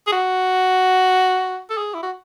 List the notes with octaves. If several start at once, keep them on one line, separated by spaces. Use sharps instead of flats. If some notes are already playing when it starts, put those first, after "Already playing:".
G#4
F#4
A4
G#4
E4
F#4